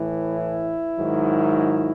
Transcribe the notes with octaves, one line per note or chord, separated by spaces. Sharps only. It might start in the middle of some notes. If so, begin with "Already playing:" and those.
Already playing: A2 E3
E4
G#2 D#3 F#3